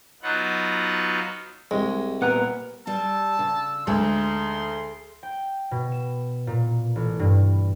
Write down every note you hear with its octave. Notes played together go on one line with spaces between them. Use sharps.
F#3 B3 D#4 F4 F#5
C2 G#3
A#2 B3 A#4 B4 F#5
G3 E5 A5 E6
C#3
D2 G#3 D#4 A4 C6
G5
B2
E7
A#2
A1
G2